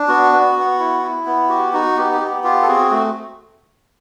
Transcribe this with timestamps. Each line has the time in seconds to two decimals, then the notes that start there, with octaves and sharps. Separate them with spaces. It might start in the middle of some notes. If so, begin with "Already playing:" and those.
Already playing: D4
0.08 B3 F#4
0.32 B3
0.56 B3
0.79 E4
1.03 E4
1.26 B3
1.49 F#4 G4
1.73 D#4 F#4
1.97 B3 G4
2.13 G4
2.20 B3
2.28 G4
2.44 F4 G4
2.63 A4
2.67 C4 F#4 G#4
2.91 A3 F#4